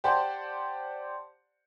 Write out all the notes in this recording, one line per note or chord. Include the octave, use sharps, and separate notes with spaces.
G4 C5 D5 F#5 A5 C6